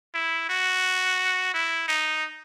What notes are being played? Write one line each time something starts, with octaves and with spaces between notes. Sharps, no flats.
E4
F#4
E4
D#4